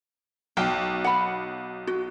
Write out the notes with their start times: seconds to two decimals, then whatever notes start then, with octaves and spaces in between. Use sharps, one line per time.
0.57 B1 G5
1.04 F#5 B5
1.87 F#4